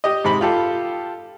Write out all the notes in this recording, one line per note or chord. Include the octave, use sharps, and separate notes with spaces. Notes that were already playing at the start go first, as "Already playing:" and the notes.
G4 D#5
G#2 C3 B5
F4 G4 A4